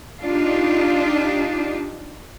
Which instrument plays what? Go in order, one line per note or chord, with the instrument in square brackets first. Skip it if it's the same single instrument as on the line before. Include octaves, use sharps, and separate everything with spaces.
[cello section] D4 D#4 F4 G4